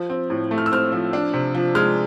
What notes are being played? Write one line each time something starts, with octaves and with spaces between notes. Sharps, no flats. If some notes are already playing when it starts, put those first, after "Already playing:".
Already playing: F3
C4
A2
A3
F6
E6
C4 F6
F3
D4
C3
F3
G#3 F6